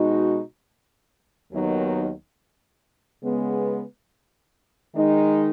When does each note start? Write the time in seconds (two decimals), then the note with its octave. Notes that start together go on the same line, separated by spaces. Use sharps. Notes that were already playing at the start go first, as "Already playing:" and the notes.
Already playing: B2 G#3 D#4 F#4
1.52 D#2 D#3 F#3 B3 D#4
3.23 C#3 G#3 B3
4.94 D#3 G#3 D#4